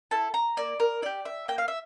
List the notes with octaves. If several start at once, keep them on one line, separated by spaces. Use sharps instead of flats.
E4 A4 A5
A#5
A#3 D5
A#4
E4 G4 D5
E5
A#3 G5
F5
E5